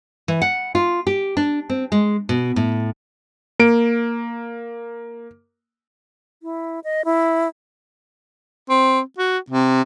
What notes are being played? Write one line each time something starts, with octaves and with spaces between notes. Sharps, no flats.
E3
F#5
F4
G4
D4
C4
G#3
B2
A2
A#3 D7
E4
D#5
E4
C4
F#4
C3